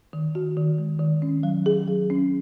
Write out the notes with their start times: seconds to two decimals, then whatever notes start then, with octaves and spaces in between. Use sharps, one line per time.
0.13 D#3
0.35 F#4
0.57 D#3
0.78 G#3
1.00 D#3
1.22 C#4
1.43 F#3
1.66 G#4
1.88 F#3
2.10 C#4